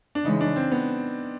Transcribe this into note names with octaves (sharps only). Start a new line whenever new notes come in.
D4
C#3 E3 G#3 D#4
D4
C4
B3